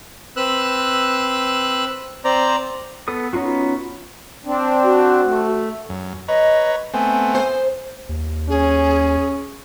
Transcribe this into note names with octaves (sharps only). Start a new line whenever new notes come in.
C4 B4 E6 F#6
C4 C5 D5 A#5
B3 A4 D#6
B3 C#4 D#4 F4 F#4
C4 D4
F#4
A3
F#2
B4 C#5 D#5 A#5
A3 B3 C4 G#5
C5
D#2
C#4 G#4